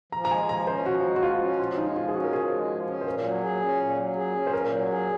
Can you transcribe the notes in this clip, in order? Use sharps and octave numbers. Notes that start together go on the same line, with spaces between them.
F3 A#5
A#5
G#3 G#5
F3 A#5
C#4 C5
F3 F#4
G#3
F#4
F3 F4
C#4
F3 F4
G#3 D#4
F3 F4
G#4
C#4 F#4
A#4
F3 G#4
G#3
F3
C#4
C5
A#2 A#4
F#3
G#4
C#4
A#2
F#3
G#4
C#4
C5
A#2 A#4
F#3
G#4